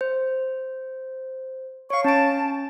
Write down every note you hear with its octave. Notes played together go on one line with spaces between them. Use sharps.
C5
C#5 F5 C#6
C#4 A5 D7